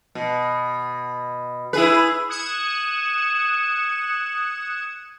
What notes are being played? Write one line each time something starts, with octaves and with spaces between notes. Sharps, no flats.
B2
E4 G#4 B4
D#6 F#6 G#6 C#7 E7